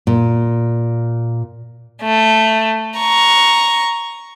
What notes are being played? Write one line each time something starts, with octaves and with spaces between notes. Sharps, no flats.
A#2
A3
A#5 C#6